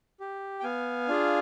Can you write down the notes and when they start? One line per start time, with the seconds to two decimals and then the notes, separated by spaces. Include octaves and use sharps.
0.20 G4
0.60 G5
0.63 B3 F5 G#5
1.08 D4 F4 G#4